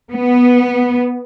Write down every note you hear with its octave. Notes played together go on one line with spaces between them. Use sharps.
B3